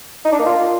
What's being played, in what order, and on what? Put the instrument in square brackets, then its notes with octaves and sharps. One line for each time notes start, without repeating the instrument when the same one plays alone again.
[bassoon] D#4
D4
A#3
F4